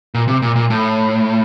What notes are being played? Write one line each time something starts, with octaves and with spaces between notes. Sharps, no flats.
A#2
C3
A#2
A#2
A2